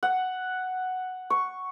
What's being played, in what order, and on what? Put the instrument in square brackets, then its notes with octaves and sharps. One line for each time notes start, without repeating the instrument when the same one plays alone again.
[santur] F#5
C#6